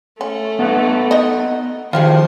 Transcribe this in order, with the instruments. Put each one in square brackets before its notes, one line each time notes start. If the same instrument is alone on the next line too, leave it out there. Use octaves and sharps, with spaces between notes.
[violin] A3 [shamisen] C#4
[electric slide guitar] B3 A4 B4
[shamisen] D#4 D#5
[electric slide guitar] D#3 F3 [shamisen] F4 G4 G#4 [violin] C5